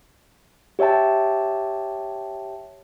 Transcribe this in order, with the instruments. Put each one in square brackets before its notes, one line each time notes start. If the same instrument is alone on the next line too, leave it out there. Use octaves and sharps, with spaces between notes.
[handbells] G4 C#5 E5 G5 A5